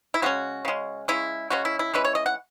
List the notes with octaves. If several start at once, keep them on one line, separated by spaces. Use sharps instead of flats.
E4
C#3 G#3 C#4 F#4
C#3 G#3 C#4
C#3 G#3 C#4 E4
C#3 G#3 C#4 F#4
E4
E4
E3 G#3 C#4 E4 B4
C#5
D#5
F#5